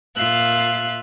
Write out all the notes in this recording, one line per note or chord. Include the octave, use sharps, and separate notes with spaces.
A#2 F4 E5 F5 F#6